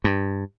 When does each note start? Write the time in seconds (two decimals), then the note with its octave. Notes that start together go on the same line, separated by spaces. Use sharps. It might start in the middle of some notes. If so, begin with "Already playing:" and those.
0.04 G2